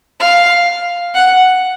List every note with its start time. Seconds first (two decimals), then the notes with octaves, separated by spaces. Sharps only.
0.20 F5
1.15 F#5